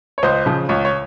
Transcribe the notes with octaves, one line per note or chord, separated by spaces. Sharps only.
C#5
C#2 C5 D#5
C#3 F3
C#2 C#5
C#5